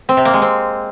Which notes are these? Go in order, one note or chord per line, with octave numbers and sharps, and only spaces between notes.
C4
C3
A#3
G#3
C4